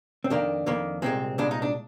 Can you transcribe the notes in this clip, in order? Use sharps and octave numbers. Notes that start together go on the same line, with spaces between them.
C4
F2 D#3 A#3 D4
F2 D#3 A#3
C2 A#2 G#3 C4
C2 A#2 G#3 D4
D#4
D4